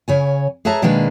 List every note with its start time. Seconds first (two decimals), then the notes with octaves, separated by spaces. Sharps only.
0.08 C#3 C#5 G#5
0.65 G#4 B4 C#5 E5 A5 A#5
0.82 B2 D#3 G#3 A#3 D4 B4